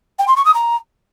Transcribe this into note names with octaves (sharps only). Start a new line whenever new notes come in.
G5
C6
C#6
D#6
A#5